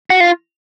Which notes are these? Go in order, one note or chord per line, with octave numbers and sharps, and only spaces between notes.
F#4
F4